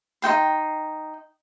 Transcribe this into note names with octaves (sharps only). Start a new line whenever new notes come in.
D#4 F#4 G5 C6